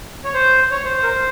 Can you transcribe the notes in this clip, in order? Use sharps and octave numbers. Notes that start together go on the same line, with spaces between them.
C#5
C5
C#5
C5
C5
A#4
C5